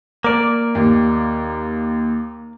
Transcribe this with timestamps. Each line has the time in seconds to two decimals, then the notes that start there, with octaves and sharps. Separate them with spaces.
0.24 A#3 D5
0.75 D#2